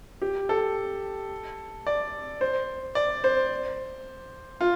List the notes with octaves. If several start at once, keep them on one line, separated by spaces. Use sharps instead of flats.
G4
A4
D5
C5
D5
C5
F4